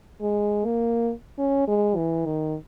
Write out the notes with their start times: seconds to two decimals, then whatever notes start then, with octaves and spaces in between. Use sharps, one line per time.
0.22 G#3
0.66 A#3
1.39 C#4
1.68 G#3
1.96 E3
2.26 D#3